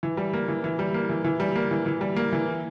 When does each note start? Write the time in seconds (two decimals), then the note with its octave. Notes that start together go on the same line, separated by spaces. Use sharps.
0.03 E3
0.17 G3
0.33 A#3
0.48 E3
0.64 E3
0.79 G3
0.94 A#3
1.09 E3
1.24 E3
1.40 G3
1.56 A#3
1.71 E3
1.86 E3
2.01 G3
2.16 A#3
2.32 E3